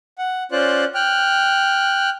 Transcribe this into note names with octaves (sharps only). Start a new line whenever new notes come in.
F#5
C#4 F4 C5 D5 F#6
G5 F6 F#6